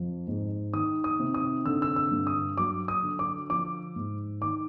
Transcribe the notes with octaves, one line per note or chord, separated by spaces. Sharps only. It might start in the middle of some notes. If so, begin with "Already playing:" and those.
Already playing: F2 F3
G#2
D#3 D#6
D#6
C3
D#6
D3 E6
E6
E6
G2
D#6
F#3 D6
D#6
D3
D6
F3 D6
G#2
D#3 D6